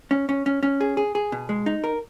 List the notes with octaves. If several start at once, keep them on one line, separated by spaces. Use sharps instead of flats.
C#4
C#4
C#4
C#4
G#4
G#4
G#4
B2
G#3
D#4
A#4